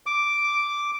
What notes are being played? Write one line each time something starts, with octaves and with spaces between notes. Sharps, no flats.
D6